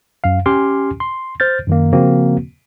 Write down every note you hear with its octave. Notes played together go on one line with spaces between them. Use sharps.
F#2 F5
C#4 G4 G#5 C6 D6 F6
C6
C5 F6 G6 A6
F#2 D#3 A#3
C#3 F3 A#3 C4 F#4